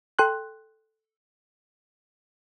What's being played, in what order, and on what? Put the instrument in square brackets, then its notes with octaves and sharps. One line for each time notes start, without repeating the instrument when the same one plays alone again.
[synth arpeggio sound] A4 G5 C6 F#6